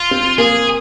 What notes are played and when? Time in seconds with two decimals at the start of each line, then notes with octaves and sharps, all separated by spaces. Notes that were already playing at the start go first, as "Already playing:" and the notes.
Already playing: F4
0.11 C4
0.38 A#3 G#4